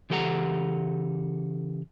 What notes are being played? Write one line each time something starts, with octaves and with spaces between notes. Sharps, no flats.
C#3 E3 G4 A4 F#5 A#5